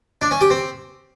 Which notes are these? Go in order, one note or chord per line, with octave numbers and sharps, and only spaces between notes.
D4
C#4
G4
C4